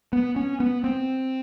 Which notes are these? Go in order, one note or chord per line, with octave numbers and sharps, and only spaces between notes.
B3
C#4
B3
C4